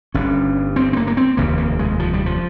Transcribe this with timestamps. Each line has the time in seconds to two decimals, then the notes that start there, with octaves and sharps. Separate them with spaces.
0.14 G1 G2 C#4
0.76 C4
0.93 C4
0.97 A#3
1.07 A#3
1.17 C4
1.37 F1 D#2 C#3 A#3
1.58 A#3
1.79 G#3
1.99 F3
2.13 G3
2.26 F3